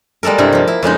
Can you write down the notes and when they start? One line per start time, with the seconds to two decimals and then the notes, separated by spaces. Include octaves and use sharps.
0.23 G3 G#3 A#3 A4 A#4
0.38 G2 C3 E4
0.53 F3 A#3
0.67 E4
0.83 F2 C#3 G#3 D#4